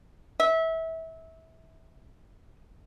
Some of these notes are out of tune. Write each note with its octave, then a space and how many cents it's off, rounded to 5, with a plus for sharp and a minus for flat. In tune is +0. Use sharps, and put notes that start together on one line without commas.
E5 -25